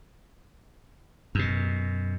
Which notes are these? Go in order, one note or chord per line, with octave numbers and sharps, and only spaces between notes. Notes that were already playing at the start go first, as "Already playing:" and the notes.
F#2 B2